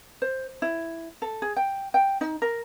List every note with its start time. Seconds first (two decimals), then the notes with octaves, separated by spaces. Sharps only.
0.22 C5
0.62 E4
1.22 A4
1.42 G#4
1.56 G5
1.94 G5
2.21 D#4
2.42 A#4